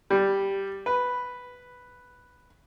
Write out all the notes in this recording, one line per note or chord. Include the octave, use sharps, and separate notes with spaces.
G3
B4